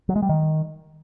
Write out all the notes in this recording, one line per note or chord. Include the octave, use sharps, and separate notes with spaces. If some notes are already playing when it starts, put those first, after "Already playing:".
F#3
G#3
G3
D#3